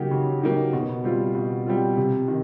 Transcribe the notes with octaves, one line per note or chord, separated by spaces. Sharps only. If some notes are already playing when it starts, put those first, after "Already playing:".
Already playing: C#3 F#3 A#3 D#4 G4
C#3
F#3 A#3 D#4 G4
B2
G3 C4 F4
B2
G3 C4 F4
C3
D#3